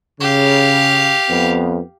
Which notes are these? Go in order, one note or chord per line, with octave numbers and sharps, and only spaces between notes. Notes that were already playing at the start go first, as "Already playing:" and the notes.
C#3 G4 F5
F2 B3